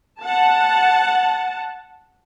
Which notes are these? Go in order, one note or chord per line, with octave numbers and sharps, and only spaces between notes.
F#5 A5